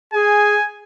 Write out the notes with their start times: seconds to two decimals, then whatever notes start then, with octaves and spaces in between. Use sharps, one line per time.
0.14 G#4 G#5